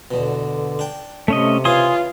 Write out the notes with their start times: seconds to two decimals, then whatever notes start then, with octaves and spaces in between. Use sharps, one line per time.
0.11 E2 B2 D3
0.79 D4 G5
1.28 C3 A3 C#4 D#5
1.65 C#3 E3 C#4 F4 G#5 C6 D#6